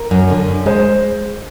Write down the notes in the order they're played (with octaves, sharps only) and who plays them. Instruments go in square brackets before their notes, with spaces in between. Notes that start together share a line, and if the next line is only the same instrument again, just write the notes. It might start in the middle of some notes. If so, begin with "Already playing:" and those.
Already playing: [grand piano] A#4
[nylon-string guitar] F#2
D3
F#2
[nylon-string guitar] G#3 [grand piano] C5